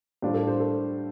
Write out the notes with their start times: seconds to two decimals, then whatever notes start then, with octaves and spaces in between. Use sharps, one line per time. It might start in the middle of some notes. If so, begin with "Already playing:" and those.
0.22 A2 G3 D4 F4 C5
0.34 A4
0.47 C5
0.60 A4